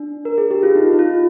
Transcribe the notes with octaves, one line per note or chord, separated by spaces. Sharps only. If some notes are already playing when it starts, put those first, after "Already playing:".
Already playing: D4
A#4
G#4
G4
F4
D#4
D#4
F4